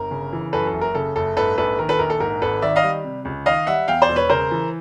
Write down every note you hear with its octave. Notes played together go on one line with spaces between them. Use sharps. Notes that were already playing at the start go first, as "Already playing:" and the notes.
Already playing: G1 A#4
C#3
E3
F#2 A4 B4
A4
F#1
A#4
C#3 A4
F#1 A4
G#2 A4 B4
A#1 A4 B4
D#3 A#4
A4 B4
A#1 A#4
A4
G#2 A#4
G#1 A4 B4
D#3 D5 E5
D#5 F5
G3
C3
C#2
D#3 D#5 F5
G3 E5 F#5
E2 F5 G5
C5 D5
E1
B4 C#5
C#3 A#4 C5
E3